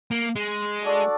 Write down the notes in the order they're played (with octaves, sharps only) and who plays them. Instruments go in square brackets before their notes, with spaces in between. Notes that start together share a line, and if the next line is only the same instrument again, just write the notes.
[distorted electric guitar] A#3
G#3
[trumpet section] D4 F#4 A4 D5